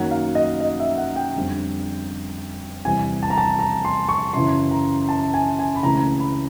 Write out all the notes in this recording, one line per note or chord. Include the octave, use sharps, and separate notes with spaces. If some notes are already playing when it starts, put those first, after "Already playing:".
Already playing: F#2 D#3 F#3 A#3 F#5
F5
D#5
D#5
E5
F#5
G5
F2 D3 G3
E2 C3 E3 G3 G#5
A5
A#5
A5
A#5
C6
C#6
F#2 C#3 E3 C6
A#5
A5
G#5
G#5
B5
C#2 C#3 E3 A3 C4 A#5
B5